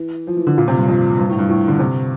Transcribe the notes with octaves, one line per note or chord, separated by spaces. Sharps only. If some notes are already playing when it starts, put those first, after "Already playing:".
Already playing: E3
F3
E3
D3
A#2
C3
G2
F2
G2
A2
G2
A2
D3
C3